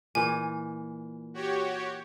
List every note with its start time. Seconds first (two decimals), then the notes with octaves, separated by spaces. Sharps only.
0.15 A#2 E3 G#5
1.34 F#4 G4 C#5